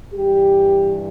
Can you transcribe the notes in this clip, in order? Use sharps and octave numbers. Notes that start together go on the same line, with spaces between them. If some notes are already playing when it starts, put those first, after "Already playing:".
G2 E3 G3 G4